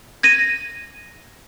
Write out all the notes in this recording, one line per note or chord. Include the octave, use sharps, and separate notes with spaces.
G#6 A#6 D#7